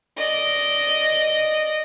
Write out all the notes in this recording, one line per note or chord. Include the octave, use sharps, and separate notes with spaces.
D5 D#5